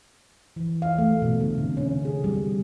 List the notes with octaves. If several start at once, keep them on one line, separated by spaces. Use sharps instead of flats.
E3
F5
A3
B2
D3
C3
C#4
G#4
G3